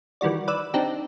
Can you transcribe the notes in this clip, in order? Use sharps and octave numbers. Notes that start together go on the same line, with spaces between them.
D#3 E3 G3 F#4 D5
B4 D5 E6
C4 D4 D#4 G4